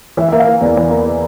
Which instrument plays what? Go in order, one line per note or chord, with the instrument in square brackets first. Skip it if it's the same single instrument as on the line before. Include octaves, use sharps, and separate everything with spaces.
[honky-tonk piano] E3 [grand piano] E5
[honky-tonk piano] A#3 [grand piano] E5
[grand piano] F5
[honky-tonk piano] A#3
[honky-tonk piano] E2 [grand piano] D5
[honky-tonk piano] E3
A#3
[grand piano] D5